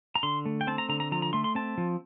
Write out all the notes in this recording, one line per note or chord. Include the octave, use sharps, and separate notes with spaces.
A#5
D3 C6
A3
G5
C4 A5
A#5
D3 A#5
A#5
F3 A#5
A#5
A3 C6
C6
C4 A5
F3